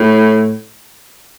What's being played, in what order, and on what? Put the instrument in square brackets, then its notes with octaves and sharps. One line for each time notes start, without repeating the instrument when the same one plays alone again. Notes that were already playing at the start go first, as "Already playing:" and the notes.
Already playing: [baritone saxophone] A2